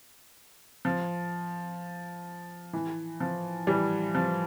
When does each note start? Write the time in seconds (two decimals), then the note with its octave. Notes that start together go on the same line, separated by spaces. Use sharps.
0.85 F3
2.73 E3
3.20 F3
3.67 E3 G3
4.15 F3